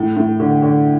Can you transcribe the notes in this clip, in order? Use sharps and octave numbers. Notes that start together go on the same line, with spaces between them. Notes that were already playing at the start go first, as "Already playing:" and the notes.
Already playing: A2
A2
D3
D3